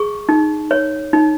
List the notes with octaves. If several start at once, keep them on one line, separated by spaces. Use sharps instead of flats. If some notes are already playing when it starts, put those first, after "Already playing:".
Already playing: G#4 C#6
D#4
C#5
D#4